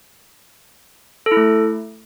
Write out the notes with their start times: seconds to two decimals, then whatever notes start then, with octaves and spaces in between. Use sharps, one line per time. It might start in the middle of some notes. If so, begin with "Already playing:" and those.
1.26 A4
1.32 E4
1.37 A3